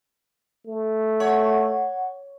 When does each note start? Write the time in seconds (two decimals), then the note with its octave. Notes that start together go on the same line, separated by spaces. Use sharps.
0.67 A3
1.20 C#5 F#5